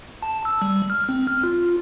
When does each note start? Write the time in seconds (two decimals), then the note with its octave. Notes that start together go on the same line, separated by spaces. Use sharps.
0.22 A5
0.45 E6
0.62 G3
0.90 F6
1.09 C4
1.27 F6
1.44 F4